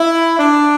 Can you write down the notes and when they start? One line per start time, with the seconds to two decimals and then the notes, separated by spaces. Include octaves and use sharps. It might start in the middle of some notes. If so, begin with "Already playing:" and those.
Already playing: E4
0.38 D4